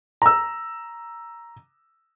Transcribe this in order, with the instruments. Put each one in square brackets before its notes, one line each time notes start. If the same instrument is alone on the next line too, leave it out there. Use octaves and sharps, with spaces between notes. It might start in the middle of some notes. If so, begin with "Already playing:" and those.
[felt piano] A#5 E6